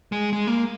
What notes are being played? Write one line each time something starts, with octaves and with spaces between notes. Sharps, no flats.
G#3
G#3
A#3